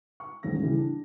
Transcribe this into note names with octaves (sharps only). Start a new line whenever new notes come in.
C#6
D#1 A1 G#2 C#4 A#6
C#3 E3 G3
D4